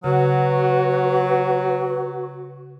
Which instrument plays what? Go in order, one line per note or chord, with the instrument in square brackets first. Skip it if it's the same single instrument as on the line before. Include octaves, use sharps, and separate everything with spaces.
[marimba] C#3 [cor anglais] F#3 [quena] F#4 [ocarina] B4